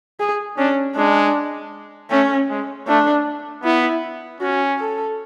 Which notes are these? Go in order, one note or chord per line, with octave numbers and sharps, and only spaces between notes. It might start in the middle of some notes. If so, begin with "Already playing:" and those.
G#4
C#4 D4
G#3 D4
A3 C#4
G#3
A3 D4
B3 E4
C#4 F#4
A4